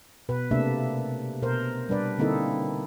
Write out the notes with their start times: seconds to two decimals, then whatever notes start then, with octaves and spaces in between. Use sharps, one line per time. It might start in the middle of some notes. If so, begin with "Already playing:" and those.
0.29 B2 B4
0.51 C3 A3 A#3 D4 E5
1.42 B2 A#4 C5
1.89 G3 D4 B4 D5
2.18 D3 A#3 C4 D#4 E4 A4